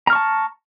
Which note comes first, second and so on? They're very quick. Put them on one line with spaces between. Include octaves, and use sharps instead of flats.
A#5 F6 C#6 A5